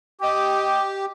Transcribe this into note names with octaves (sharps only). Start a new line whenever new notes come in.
G4 D#5 G5 D6